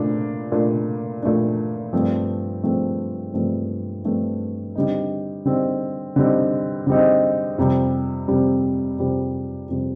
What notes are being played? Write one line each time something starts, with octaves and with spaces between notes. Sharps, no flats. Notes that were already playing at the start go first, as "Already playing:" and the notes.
Already playing: A#2 A3 D4
A#2 A3 D4
A#2 A3 D4
G2 F3 A3 C4
G2 F3 A3 C4
G2 F3 A3 C4
G2 F3 A3 C4
D3 G3 C4 D#4
D3 G3 C4 D#4
D3 G3 C4 D#4
D3 G3 C4 D#4
F2 C3 G3
F2 C3 G3
F2 C3 G3
F2 C3 G3